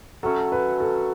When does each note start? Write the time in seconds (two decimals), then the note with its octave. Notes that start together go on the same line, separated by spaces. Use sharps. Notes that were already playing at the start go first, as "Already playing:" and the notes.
0.23 F#3 A3 C#4 A4
0.52 B4
0.80 A4